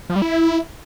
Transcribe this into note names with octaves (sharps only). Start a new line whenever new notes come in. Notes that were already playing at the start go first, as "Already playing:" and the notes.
F3
G3
E4